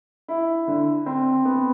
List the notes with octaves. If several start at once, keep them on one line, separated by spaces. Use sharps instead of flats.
E4
D3
C4
B3